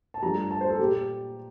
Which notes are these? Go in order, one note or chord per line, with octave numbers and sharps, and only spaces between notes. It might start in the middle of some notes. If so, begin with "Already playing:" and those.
A5
G2 F3 A3 A#5
A5
C5
A4
A#2 G3 G4